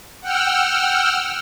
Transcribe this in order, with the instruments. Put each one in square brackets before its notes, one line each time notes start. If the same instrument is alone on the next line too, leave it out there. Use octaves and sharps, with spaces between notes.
[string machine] F#5 G5 E6 F6